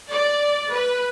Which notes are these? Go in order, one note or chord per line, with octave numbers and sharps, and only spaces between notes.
D5
B4